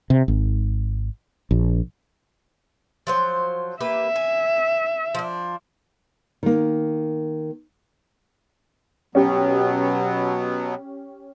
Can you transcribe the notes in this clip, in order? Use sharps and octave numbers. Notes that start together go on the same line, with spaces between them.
C3
G#1
A#1
F3 F#3 C5
A#3 G4 B4 E5
G#5
F3 D4
D#3 A#3
B2 F#3 B3 C#4 G4